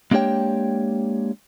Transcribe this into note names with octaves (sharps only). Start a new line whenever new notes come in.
G#3 A#3 D4 G4 C#5 G5